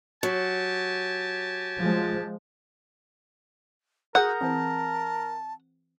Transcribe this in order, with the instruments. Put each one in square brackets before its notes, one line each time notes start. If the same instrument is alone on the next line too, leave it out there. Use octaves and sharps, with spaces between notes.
[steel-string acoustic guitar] F#3 [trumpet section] G4 G#5 A5
[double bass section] F3 G#3
[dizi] F#4 [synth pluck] G#4 D#6 G6 [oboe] A#4 [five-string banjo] F#5
[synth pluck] E3 C4 [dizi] A5